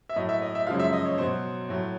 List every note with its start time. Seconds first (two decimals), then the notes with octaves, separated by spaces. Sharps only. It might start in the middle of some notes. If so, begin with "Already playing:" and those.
0.09 E5
0.16 A2 F#3 D#5
0.29 E5
0.42 D#5
0.55 E5
0.67 F#2 C#3 F3 G#3 F5
0.79 E5
0.93 D#5
1.06 C#5
1.18 B2 F#3 C5
1.69 A2 F#3